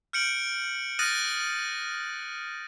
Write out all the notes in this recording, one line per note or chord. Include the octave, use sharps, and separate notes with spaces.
F6 G6 C#7 D7 F#7
D#6 F6 F#6 A6 A#6 D#7